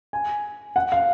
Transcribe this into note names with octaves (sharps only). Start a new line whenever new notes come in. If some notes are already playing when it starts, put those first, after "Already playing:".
G#5
F#5
F5